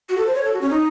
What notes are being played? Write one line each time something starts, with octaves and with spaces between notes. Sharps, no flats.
F#4
A4
C5
C#5
A4
F#4
C#4
D#4